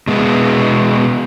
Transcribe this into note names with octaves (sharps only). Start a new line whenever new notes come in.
B2 G#3 B3